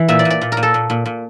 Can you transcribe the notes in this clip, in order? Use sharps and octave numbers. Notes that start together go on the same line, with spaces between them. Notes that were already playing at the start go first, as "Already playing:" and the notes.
Already playing: E3
A#2 E5
D5
A#2
D5
A#2
A#4
A#2
A4
A#2
A#2
A#2